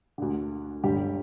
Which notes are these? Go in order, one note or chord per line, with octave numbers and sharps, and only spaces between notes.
D2 D3
G1 G2 D3 G3 G4